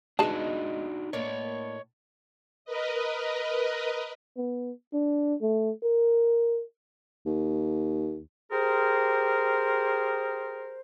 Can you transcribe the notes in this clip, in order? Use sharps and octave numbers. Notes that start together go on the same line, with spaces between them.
G#3 B3 D4 D#4 F#4 G#4 A5
A2 A#3 D4 C#5 D#5
A#4 B4 D#5
B3
D4
A3
A#4
D#2
G4 G#4 A#4 C5